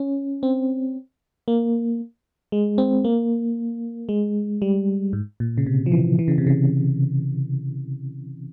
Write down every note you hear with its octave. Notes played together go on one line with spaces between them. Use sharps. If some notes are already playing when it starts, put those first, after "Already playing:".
Already playing: C#4
C4
A#3
G#3
C4
A#3
G#3
G3
G#2
A#2
C#3
C3
F3
E3
E3
C#3
C3
C#3